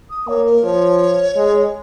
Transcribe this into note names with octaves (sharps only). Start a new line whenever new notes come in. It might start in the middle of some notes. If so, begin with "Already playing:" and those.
D#6
A#3 C#5
A#4
F3 C#5
G#3